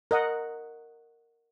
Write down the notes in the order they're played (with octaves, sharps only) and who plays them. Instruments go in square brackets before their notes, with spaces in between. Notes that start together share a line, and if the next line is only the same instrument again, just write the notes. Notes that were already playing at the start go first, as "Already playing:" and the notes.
[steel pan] A#4 D#5 F#5